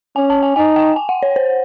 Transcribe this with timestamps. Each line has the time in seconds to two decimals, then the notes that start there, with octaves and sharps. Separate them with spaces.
0.16 C#4 G#5
0.30 A5
0.43 G#5
0.56 D#4 G#5
0.76 G5
0.96 G#5
1.09 F#5
1.23 C#5
1.36 C5